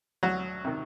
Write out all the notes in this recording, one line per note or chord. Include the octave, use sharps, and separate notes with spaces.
D2 F#3 F#4
C3 D#3